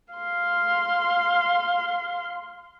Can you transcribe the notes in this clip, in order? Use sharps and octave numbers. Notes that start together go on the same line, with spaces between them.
F5 C6